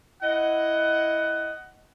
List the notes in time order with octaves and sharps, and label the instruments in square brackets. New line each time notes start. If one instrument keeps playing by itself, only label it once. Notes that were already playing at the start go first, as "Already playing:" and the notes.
[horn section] E4 D#5 F#5